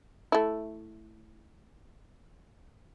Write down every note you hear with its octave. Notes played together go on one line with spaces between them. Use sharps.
A3 E4